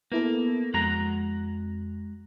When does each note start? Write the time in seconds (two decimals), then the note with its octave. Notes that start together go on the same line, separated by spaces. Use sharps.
0.12 A#3 B3 E4 A4
0.74 F2 G#3 F#4 A#5